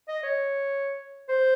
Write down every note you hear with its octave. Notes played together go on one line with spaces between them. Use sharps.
D#5
C#5
C5